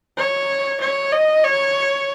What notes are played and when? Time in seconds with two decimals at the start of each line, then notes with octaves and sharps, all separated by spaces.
0.18 C#5
0.81 C#5
1.12 D#5
1.44 C#5